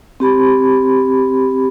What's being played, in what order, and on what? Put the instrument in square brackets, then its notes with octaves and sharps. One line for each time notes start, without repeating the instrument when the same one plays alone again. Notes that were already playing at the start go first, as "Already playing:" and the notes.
[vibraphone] C4 G4 B5